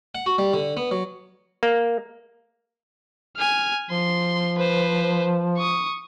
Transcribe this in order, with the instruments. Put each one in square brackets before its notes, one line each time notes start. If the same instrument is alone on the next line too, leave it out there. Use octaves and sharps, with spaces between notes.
[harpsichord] F#5
F#4
G3
D3
B3
F#3
[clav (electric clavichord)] A#3
[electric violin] G#5 F6
[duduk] F3 [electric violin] C6
[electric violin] B4 C5
C#6 D#6